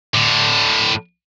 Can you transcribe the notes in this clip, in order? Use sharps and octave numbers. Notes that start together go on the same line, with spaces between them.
A2 D3